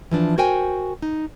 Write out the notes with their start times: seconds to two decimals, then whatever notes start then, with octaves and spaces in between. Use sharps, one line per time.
0.11 E3 F3 D4
0.38 F#4 A#4 C5 G5 G#5
1.02 D#4